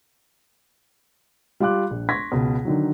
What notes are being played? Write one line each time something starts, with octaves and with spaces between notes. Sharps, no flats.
G3 F4 F5 D6 F#6
A#1
C6 C#6 G#6 A#6 B6
C#2 B2
D3 D#3 F#3